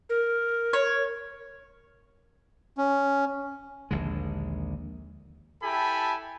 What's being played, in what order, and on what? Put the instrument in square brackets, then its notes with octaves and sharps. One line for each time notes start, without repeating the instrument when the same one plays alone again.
[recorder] A#4
[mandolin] C#5
[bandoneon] C#4
[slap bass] A#1 D#2 D3 G#3
[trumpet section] E4 G4 A4 G#5 A5 B5